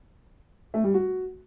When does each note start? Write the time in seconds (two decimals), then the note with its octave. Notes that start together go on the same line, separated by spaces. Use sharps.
0.74 A3
0.84 G3
0.94 F#4